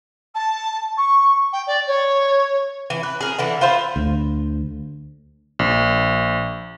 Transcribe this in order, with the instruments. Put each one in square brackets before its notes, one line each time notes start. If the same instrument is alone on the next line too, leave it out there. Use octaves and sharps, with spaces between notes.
[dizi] A5
C#6
G5
D5
C#5
[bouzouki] E3
B4
G#4 A#4
D3 E3 E4
F4 B4 C5 E5
[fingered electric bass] D2
[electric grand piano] A#1